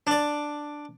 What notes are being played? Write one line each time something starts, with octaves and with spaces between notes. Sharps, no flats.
D4 D5